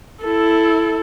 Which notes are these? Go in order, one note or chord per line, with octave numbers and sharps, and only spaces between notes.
E4 A4